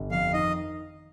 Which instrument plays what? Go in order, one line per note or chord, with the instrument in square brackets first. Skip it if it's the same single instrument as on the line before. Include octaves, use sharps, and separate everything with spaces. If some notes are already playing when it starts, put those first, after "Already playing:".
Already playing: [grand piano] G1
[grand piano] F2 [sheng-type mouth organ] F5
[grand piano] D#3 [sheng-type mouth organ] D#5